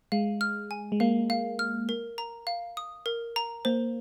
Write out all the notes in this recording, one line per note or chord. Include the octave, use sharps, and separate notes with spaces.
G#3 F5
F6
G#5
G#3
A#3 F5
F5
F6
A#4
A#5
F5
D#6
A#4
A#5
A#3 C5